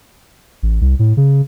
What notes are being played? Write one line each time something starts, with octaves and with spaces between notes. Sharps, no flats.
A1
C2
A2
C#3